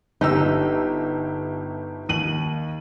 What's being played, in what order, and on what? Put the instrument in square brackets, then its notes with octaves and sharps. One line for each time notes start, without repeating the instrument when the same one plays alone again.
[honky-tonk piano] G1 G4 E6 [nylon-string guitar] D#4
[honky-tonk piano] D#2 D#7 F#7